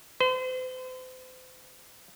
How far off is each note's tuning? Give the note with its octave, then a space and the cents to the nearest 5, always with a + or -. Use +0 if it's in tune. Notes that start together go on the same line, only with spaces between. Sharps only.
C5 -40